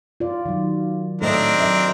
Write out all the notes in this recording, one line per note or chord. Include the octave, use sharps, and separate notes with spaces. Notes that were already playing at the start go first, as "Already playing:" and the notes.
F4 D5
D#3 F#3
A2 C4 D4 A4 A#4 C5 D#5 E5
F#3 E5